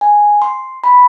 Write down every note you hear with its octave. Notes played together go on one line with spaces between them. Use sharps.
G#5
C6
B5